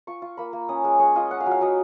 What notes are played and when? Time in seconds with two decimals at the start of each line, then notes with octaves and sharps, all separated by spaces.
0.07 F4 C#6
0.22 F4
0.37 A#3 B5
0.53 A#3
0.69 C#4 D#6
0.84 G#3
0.99 G#3 C#5
1.16 F4 D#5
1.31 C#4 F#5
1.40 F5
1.46 F#3
1.51 F5
1.61 F#3 D#5